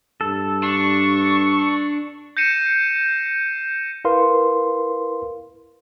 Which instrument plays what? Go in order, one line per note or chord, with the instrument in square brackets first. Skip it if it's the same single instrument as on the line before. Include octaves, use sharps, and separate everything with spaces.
[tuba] G2 [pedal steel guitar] A4
[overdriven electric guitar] D4 [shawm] C#6
[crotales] G6 A#6 C7 C#7 D#7 E7
[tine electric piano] E4 A#4 B4 F5 C6